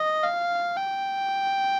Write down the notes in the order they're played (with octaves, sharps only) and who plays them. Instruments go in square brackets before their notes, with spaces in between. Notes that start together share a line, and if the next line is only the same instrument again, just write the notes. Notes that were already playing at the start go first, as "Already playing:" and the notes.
Already playing: [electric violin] D#5
F5
G5